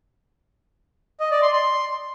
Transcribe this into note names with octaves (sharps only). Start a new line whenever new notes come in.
D#5
D5
C6
C6